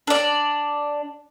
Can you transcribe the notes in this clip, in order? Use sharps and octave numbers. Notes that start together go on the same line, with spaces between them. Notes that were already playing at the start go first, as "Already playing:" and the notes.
D4 D5